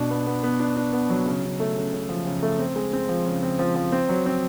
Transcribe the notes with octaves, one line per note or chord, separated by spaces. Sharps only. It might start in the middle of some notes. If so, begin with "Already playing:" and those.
Already playing: B2 D4
B3
B3
B3
D4
D4
B3
F#3
C#3
C#3
A3
C#3
C#3
F3
C#3
A3
C4
G#3
C4
F3
C#3
C4
F3
F3
C4
F#3
C4